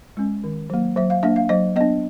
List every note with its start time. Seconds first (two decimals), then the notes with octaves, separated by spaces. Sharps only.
0.17 G#3 C#4
0.44 D#3
0.70 F#3 A#3
0.96 F#3 E5
1.10 F5
1.23 A#3 D4 E5
1.36 F5
1.49 F#3 D#5
1.76 B3 D4 D#5